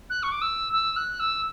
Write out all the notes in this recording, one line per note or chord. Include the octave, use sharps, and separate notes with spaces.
F#6
C#6
D6
E6
E6
F#6
E6